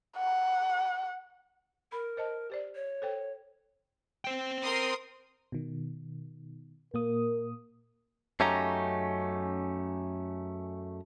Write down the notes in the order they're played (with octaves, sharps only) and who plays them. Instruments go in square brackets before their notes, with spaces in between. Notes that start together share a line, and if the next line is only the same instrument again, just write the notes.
[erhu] F#5
[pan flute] A#4 [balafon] B5
[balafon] C5 D#5 A5
G4 C5 D5
[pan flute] C#5
[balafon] A4 C5 G5
[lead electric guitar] C5 G5
[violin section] A#4 C6 D#6
[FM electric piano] B2 D#3
[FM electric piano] A#2 A#3 D#6 [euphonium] A#4
[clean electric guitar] F#2 A3 C#4 D#4 G4 A#5